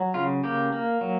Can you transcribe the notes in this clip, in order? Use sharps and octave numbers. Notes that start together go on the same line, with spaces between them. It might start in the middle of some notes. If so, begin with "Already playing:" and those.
Already playing: F#3
C#3 F4
A#3 G4
A#3
F#3